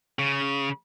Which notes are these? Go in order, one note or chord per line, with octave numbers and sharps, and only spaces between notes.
C#3